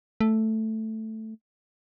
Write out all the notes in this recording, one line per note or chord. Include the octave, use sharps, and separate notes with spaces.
A3